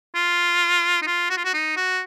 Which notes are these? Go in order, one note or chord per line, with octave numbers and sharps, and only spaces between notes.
F4
D#4
F4
F#4
F4
F#4
D#4
F#4